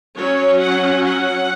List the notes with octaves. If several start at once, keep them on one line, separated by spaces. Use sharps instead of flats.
F#3 C#4 C#5
F#5
F#5